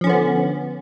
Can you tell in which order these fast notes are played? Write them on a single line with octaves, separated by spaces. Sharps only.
F3 C#4 D3 B3